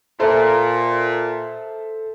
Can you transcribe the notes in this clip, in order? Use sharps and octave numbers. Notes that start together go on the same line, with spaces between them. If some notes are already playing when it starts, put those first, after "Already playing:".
A#2 A4 C5 E5